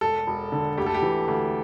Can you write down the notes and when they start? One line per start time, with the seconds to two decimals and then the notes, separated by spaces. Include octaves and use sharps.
0.01 E1 A4
0.27 E1
0.52 D3
0.78 D2 G4
0.86 A4
0.95 G4
1.02 E3
1.28 D2